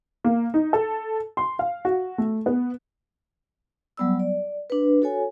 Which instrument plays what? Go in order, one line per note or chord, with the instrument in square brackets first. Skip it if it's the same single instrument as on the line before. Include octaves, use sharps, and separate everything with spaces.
[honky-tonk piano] A#3
D#4
A4
C6
F5
F#4
A3
B3
[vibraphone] F#3 G3 B3 D5 E6
D5
D4 B4
F#4 A4 C#5 G#5